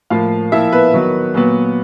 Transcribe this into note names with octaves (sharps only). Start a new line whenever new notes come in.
A2 F3 A#3 F4 F5
A#2 F3 A#3 E4 E5
B3 B4
D#3 F#3 B3
A#2 F#3 B3